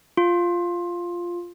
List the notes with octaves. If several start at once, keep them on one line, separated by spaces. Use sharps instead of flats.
F4